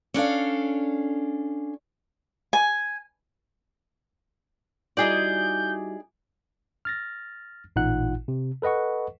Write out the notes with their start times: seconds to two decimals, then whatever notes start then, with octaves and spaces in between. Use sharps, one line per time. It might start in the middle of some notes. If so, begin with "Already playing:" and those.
0.14 C#4 D4 A4 F5
2.53 G#5
4.97 G3 D#4 E4 F#4 G#4 D5 G6
6.85 F6 A6 A#6
7.76 A1 A#2 D#4 F4 F#5 F#6
8.28 C3
8.62 A4 B4 D#5 F#5 C#6